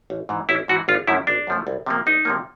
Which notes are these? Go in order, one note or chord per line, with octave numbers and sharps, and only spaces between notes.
A1
G#2 E3
A1 E4
G#2 E3 F#4
G#1 F4
F#2 C#3 F3 A3 E4
G#1 D4
F#2 C#3 F3 A3
C2
C3 F3 A#3
C2 D#4
C3 F3 A#3